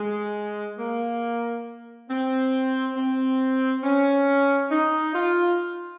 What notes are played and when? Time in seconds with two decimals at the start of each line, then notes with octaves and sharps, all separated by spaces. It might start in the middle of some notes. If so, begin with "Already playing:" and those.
Already playing: G#3
0.78 A#3
2.09 C4
2.96 C4
3.83 C#4
4.70 D#4
5.14 F4